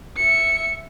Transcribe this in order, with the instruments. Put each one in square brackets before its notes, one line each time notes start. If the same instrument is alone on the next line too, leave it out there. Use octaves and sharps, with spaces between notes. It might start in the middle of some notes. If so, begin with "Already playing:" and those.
[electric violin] E5 C#7